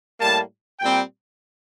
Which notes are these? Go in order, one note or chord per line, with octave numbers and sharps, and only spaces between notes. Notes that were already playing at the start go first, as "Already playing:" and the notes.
A2 G3 A#3 A5
A#2 G3 C4 G5